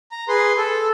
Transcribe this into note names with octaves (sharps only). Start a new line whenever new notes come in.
A#5
G#4 B4 C6
A4